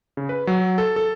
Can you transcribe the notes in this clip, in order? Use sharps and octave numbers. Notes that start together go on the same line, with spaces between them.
C#3
B4
F#3
A4
A4